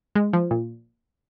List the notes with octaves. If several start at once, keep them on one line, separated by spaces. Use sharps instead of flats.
G#3
F3
A#2